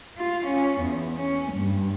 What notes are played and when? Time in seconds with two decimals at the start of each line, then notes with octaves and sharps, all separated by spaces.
0.17 F4
0.47 C#4
0.81 E2
1.16 C#4
1.52 G2